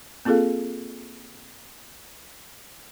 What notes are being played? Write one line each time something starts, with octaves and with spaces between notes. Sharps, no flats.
A#3 C4 F4 G#4 A4 F5